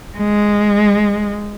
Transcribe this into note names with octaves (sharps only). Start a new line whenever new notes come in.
G#3